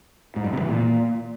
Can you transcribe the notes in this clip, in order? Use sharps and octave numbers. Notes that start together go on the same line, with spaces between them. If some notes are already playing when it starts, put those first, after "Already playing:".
G#2
G2
C3
E3
A#2